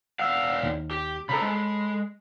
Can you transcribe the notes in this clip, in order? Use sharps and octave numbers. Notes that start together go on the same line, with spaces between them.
E2 F5 F#5 E6
D#2
G4
C#3 A4 A#5 B5
G#3